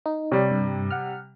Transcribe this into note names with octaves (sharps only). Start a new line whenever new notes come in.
D#4
C3 G3 C#5
G2
F#5 F6